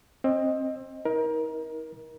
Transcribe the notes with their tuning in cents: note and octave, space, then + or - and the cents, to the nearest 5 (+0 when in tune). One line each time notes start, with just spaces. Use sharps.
C4 +25 D#5 +0
D#4 +40 A#4 +25